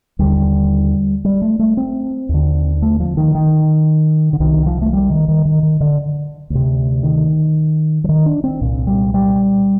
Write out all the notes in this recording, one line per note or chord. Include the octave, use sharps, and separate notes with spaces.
D#2 D3 G3
G3
A3
A3
C4
D#2 D3
A3
F3
D#3
D#3
D3
C2 C3 D#3
F3
A3
G3
D#3
D#3
D#3
D#3
D3
D2 C3
D#3
F3
D#3
D4
C4
C2 A#2
G3
G3